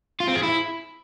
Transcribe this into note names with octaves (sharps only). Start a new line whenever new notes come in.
F4
C4
G#4
E4